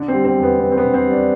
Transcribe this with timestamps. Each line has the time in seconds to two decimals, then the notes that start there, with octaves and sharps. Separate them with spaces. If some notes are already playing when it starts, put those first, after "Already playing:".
Already playing: D3
0.08 C4
0.13 G3
0.24 C4
0.36 E2
0.43 B3
0.59 E2 C4
0.72 C4
0.78 B3
0.83 D3
0.94 C4
1.05 G3
1.11 D4